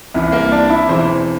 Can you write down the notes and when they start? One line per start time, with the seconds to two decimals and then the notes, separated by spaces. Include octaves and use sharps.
0.14 C2 C3 E3
0.32 A#3 A#4
0.52 D4 D5
0.70 E4 E5
0.89 E1 E2 E3 C4 C5